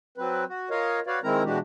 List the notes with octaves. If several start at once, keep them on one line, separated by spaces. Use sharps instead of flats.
F#3 C4 B4
F#4
F4 A#4 C#5 D#5 F5
F#4 B4 C#5 D5 F5
D#3 G#3 C4 E4 A#4 A#5
B2 E3 G#3 D4 F#4 G4